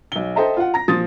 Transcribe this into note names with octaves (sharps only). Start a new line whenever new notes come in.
B1 G7
A4 C5 D#5 E5 G5 A#5
F4 F#5
A#5 A#6
A#2 F3 D#6 A6